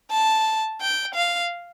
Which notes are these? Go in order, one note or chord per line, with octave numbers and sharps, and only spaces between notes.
A5
G5
F5